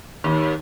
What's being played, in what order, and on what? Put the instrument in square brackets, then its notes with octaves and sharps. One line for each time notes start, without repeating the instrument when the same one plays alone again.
[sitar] D#2